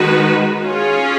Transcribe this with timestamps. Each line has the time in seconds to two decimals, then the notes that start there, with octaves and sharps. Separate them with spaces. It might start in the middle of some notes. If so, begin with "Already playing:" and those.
Already playing: D#3 G#3 D#4 F#4 B4
0.62 C#4 F4 G#4